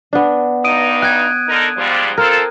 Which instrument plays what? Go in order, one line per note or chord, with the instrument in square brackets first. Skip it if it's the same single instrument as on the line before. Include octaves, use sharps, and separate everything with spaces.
[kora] B3 D4
[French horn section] G2 D#4 [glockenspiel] D#6 D7 D#7
[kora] G5 [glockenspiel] F#6 G#6
[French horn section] D3 D#4 A#4
G#2 F3 G3
[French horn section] C4 F4 A4 [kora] A#4